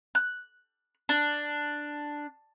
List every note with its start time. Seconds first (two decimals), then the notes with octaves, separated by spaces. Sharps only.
0.15 F#6
1.09 D4